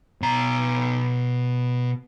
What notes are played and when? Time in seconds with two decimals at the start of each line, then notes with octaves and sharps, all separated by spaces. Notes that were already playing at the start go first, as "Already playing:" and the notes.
0.22 B2 A#5